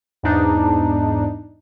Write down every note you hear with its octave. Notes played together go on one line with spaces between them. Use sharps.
E2 G#2 D4 D#4